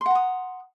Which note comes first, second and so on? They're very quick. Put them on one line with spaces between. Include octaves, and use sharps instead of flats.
C6 F#5 A#5 D#6